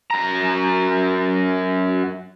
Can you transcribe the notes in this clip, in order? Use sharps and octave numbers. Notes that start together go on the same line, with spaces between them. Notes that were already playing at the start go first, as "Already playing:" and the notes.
F#2 A#5